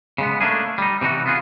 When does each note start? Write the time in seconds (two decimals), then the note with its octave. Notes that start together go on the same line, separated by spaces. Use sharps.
0.18 C#3 G#3 B3
0.41 A3 A#3 C#4 D4 G#4
0.78 G3 D#4
1.01 C3 E3 D#4 F#4
1.26 B3 F4 G#4